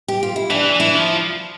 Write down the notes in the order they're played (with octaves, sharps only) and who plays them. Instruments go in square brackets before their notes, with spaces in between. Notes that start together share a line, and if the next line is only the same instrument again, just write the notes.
[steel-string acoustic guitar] G4
F4
E4
[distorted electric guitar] E3 [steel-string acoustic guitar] D4
[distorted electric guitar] E3
[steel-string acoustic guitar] E4
[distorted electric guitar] F3